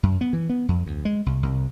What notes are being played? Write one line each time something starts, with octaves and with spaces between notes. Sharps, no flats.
F#2
B3
E3
B3
F2
D2
G#3
C2
C2